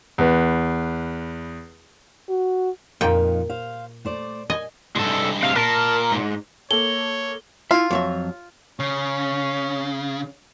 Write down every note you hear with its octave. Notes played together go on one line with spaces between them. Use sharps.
E2 B4
F#4
F2 A#2 F3 D#4 G5
C5 F5
A3 C5 D5
D#5 G#5
C2 G2 G#3 A4
C3 C4 F5
A#2 A#4 A5
G#2
A#3 A4 C#5 G7
E4 F4 E5
F2 F#3 E5
C#3 C#4